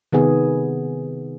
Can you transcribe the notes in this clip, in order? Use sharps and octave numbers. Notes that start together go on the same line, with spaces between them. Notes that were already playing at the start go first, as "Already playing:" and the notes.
C3 D#3 B3 G#4